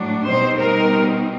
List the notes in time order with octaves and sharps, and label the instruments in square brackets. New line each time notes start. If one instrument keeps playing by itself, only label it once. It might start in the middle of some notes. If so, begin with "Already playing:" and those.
Already playing: [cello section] A2 F#3 A3 D4
B2 G3 C4 D#4 C5
A#4